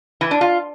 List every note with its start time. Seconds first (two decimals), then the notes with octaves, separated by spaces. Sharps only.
0.21 E3
0.31 D4
0.41 F4